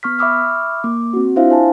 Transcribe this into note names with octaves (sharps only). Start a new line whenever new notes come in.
B3 C#6 F6 B6
E5 B5 C#6 D6 E6 F6
A#3 D6
C4 F#4
D4 E4 F4 C5 E5 F5
C5 G#5 A5